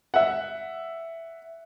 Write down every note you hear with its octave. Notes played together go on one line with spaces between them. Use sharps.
E5 F#5